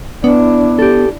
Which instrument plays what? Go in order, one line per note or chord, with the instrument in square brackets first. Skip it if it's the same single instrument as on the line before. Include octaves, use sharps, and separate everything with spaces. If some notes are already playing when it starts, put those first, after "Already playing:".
[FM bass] B3 [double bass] D4 E4
[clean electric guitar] G4 A4